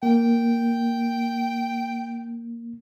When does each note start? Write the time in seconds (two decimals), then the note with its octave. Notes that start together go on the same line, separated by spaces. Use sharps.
0.03 A#3 G5